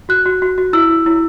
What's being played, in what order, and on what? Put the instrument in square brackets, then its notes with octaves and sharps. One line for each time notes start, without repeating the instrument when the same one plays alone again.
[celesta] F#4 F#6
F#4
F#4
F#4
E4 E6
E4
E4